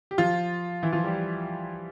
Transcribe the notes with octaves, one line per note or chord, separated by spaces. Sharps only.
G4
F3 F4
E3 E4
F3 F4
G3 G4